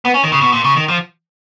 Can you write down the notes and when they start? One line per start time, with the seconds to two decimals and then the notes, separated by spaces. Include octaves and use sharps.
0.05 B3
0.14 C#4
0.23 D#3
0.32 C#3
0.41 B2
0.52 A#2
0.64 C#3
0.76 D#3
0.88 F3